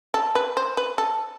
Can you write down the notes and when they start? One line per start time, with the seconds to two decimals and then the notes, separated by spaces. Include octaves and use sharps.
0.14 A4
0.35 B4
0.57 C5
0.77 B4
0.98 A4